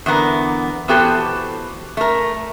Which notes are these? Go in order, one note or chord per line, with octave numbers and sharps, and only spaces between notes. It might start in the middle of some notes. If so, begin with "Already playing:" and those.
E2 D3 B3 A#4
E3 B3 F#4 G4 A4 C5
A3 A#4